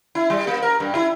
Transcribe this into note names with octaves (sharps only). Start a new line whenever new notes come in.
E4
G3
A#3
A#4
G2
E4